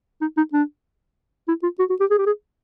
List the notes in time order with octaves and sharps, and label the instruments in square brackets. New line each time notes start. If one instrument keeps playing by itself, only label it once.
[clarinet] D#4
D#4
D4
E4
F4
F#4
F#4
G4
G#4
G4
G#4